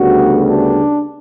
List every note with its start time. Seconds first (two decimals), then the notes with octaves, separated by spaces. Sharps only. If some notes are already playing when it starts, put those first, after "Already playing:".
Already playing: D2 C#3 G3 B3 F#4
0.47 D4